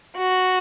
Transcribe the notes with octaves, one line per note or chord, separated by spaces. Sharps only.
F#4